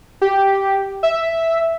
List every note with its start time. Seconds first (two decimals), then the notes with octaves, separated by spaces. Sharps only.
0.21 G4
1.03 E5